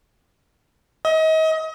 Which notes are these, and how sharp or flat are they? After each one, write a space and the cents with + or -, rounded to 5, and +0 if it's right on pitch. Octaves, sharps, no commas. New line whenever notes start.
D#5 +35